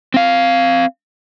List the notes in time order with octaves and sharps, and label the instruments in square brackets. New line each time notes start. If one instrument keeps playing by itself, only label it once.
[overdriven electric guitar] C4 F5